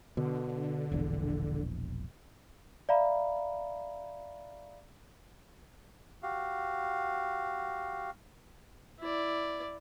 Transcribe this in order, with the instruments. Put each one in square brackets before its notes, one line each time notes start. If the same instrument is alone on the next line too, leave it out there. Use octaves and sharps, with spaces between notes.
[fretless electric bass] B2 [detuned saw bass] D3
[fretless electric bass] E1 A#1 E2
[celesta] D5 E5 F5 A#5 B5
[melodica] F#4 G4 F5
[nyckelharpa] E4 D5